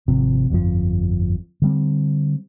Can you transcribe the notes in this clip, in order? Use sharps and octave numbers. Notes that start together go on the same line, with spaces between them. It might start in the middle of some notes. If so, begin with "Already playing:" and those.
G#1 C3 F3 C4
G1 F2 G#2 F3
D3 G3 C4